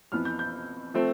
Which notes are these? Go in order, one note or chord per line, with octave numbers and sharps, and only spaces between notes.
F2 E3 B3 F6
G6
G6
F3 A3 C4